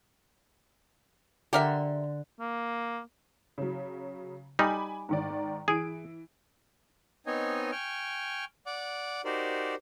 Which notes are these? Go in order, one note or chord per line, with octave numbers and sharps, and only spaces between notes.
D3 G4 A#4 E5 C6
A#3
C#3 F#3
G3 D#4 G#5 B5 D6
G#2 D#3 D5
E3 G#4 D7
B3 C4 D#4 C#5 D#5 G#5
G5 G#5 C#6 F6
D5 F#5 D6
D#4 F#4 G4 A#4 C5 D5